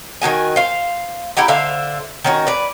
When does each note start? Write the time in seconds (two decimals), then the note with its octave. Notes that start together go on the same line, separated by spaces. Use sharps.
0.22 D#3 D#4 F#4 G#5
0.56 C5 F5
1.37 E4 G4 F#5 A#5
1.48 D3 C5 E5 F5
2.24 D#3 C#4 F#4
2.47 B4 D5